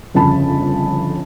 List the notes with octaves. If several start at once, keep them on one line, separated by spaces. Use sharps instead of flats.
G1 F2 C#3 A5 B5